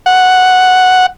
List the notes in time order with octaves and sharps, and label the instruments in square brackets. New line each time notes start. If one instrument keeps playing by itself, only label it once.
[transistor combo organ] F#5